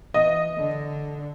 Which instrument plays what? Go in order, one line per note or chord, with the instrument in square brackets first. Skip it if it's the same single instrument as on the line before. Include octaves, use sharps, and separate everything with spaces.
[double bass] E3 [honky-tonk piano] D#5
[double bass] D3